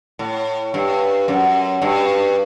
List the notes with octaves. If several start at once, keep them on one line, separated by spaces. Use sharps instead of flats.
A2
G2
F#2
G2